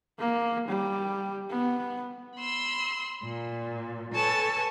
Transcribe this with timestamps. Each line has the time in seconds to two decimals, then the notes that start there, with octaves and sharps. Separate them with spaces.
0.19 A#3
0.69 G3
1.50 B3
2.38 B5 C6 E6
3.24 A#2
4.14 A4 B4 C#5 G#5 A5